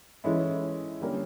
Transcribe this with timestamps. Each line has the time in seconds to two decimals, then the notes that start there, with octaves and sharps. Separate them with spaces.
0.24 E3 G#3 C#4 E4 A4
1.00 D3 G3 A#3 C#4